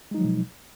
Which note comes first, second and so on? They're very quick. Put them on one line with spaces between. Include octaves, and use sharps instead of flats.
G#3 D#4 F#3 F3 B2